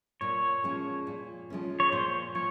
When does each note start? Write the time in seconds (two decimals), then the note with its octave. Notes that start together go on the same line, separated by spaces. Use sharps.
0.21 A#2 C#5
0.64 F3 G#3 C#4
1.07 A#2
1.50 F3 G#3 C#4
1.80 C#5
1.92 A#2 C5
2.35 F3 C#5